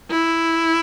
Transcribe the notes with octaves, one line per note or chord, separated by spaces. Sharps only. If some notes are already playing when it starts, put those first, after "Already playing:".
E4